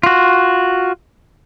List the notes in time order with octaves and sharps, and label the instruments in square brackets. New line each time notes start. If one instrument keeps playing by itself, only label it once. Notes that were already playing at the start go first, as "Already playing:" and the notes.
[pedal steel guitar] F4 F#4